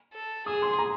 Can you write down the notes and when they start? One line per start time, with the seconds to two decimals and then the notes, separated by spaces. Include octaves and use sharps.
0.14 A4
0.46 G#4 D#6
0.62 C6
0.79 A#5